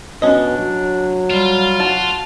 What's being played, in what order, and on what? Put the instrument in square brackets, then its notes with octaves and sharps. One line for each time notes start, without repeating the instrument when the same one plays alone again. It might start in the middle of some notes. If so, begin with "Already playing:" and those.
[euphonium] B2 [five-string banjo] C#4 D#5 [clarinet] D4
[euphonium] F#3
[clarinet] G3 [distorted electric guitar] F4
[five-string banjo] F#4 [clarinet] A5